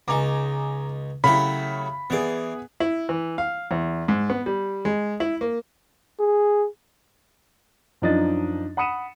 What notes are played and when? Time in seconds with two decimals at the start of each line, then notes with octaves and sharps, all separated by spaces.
0.08 C#2 D#4 G#5 A#5 D6
1.24 C#3 F#3 A3 E4 G4 B5
2.10 E3 B3 G#4 D5
2.80 E4
3.09 E3
3.38 F5
3.71 E2
4.08 G#2
4.30 B3
4.46 G3
4.85 G#3
5.20 E4
5.41 A#3
6.19 G#4
8.02 F#2 F3 D4 D#4 D#5 A6
8.77 F#5 B5 D#6 C#7 D#7 E7